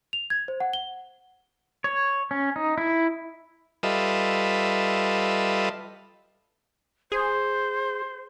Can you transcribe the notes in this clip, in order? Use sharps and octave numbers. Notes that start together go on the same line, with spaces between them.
F7
G#6
C5
F#5
G7
C#5
C#4
D#4
E4
G3 F4 A4 B4 D#5 E5
G#4 C5